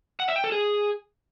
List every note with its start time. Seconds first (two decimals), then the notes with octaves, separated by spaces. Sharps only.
0.20 F#5
0.28 E5
0.36 G5
0.44 A4
0.52 G#4